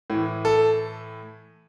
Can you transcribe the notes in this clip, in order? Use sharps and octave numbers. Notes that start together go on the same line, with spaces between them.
A2 E3
A4